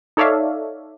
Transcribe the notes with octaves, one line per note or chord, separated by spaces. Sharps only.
D#4 A4 C#5 D5 E5 F5